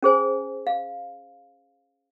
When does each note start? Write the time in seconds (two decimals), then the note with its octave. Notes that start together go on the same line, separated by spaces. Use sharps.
0.03 C#4 G#4 C5 G#5
0.67 F5